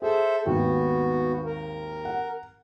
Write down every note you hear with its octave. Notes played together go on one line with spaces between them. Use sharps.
G#4 A4 C5 E5
G#1 D#2 B3 F#4 G5
A#4
F#5